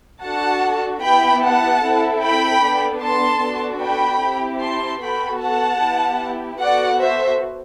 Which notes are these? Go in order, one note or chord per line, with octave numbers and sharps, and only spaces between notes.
D4 F#4 A4 F#5 A5
B3 E4 G4 G5 B5
F#5 A5
C4 E4 A4
G5 B5
B3 D4 A4
A5 C6
B3 D4 F#4 A4
G5 B5
C4 E4 G4
A5 C6
B3 F#4 A4 G5 B5
F#5 A5
B3 E4 G4
B3 F#4 A4 D5 F#5
C5 E5